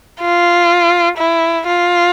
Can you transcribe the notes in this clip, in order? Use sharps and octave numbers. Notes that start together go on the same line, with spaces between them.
F4
E4
F4